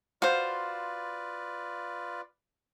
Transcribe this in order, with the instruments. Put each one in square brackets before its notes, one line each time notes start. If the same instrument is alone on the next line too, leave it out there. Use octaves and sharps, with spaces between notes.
[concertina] F4 B4 D5 [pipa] F#4 C5 [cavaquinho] F5